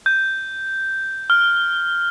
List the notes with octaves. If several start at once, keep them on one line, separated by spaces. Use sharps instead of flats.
G6
F6